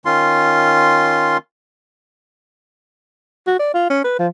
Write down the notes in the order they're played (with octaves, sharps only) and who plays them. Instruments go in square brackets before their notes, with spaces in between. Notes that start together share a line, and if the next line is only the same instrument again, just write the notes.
[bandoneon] D#3 C#4 F4 C6
[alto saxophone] F#4
D5
F4
C#4
B4
F3